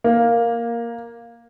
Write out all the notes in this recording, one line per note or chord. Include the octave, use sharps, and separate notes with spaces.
A#3